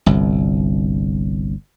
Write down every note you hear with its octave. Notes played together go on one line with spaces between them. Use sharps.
G1 C2